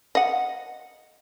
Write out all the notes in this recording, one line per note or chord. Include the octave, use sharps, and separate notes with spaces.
D#5 F#5